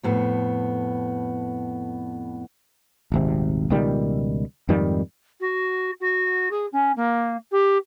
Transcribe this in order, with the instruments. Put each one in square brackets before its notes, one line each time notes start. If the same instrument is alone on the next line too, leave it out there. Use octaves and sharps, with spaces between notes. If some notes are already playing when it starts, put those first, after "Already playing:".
[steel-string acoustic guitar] F2 A2 B3
[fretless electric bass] D#1 G#1 C3
C#2 B2 D#3 G3
F2 G#2 D#3 G3
[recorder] F#4
F#4
G#4
C#4
A#3
G4